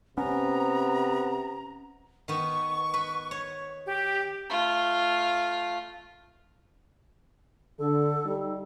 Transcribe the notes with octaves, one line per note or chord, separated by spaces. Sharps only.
C3 B3 C#4 A#5
D#3 B3 C#6
B4
C#5
G4
A3 F4
D3 A4
G3 D#4